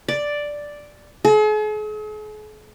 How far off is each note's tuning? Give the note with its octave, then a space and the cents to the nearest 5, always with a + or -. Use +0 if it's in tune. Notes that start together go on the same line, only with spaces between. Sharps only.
D5 +0
G#4 +45